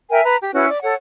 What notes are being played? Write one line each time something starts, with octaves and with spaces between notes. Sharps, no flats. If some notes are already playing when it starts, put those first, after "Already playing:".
A#4 E5 G5 G#5
B4 A#5 B5
G4
C#4 E4 F#4 B4
D5 D6
A4 C#5 F#5